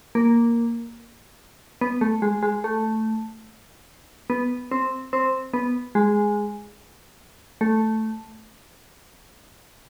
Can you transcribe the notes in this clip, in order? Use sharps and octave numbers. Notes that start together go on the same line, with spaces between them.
A#3
B3
A3
G#3
G#3
A3
B3
C4
C4
B3
G#3
A3